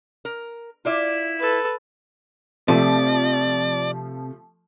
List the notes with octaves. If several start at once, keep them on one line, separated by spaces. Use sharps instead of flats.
A#4
E4 F4 D5 E5
A4 B4
C3 F3 A3 D5